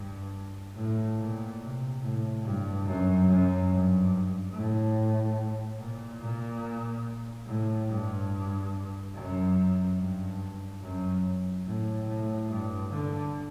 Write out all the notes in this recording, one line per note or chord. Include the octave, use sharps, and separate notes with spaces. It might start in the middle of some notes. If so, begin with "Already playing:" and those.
Already playing: G2
A2
A#2
C3
A2
G2
F#2
F#2
G2
A2
A#2
A#2
A2
G2
F#2
G2
F#2
A2
A2
G2
D3